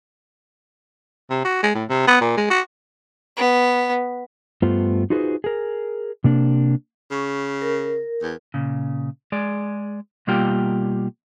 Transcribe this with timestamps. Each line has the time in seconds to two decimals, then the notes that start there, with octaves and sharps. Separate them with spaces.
1.30 C3
1.45 F#4
1.63 G#3
1.75 A2
1.89 C3
2.07 B3
2.21 A#2
2.37 G#3
2.50 F#4
3.37 B3
4.62 G2 A3 B3 F4 C5
5.10 D#4 F4 F#4 G#4 B4 C5
5.44 G#4 A#4
6.24 C3 A#3 D4
7.11 C#3 C#6
7.62 A#4
8.22 E2
8.54 A#2 C#3
9.32 G#3 G#4 D5
10.27 B2 G3 A#3 F4 G4 G5